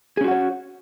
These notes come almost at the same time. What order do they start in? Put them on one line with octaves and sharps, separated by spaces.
G#4 C#4 F#4 F#5 C#5